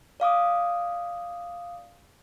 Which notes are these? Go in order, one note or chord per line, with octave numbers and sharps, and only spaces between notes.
D5 F5 D6 D#6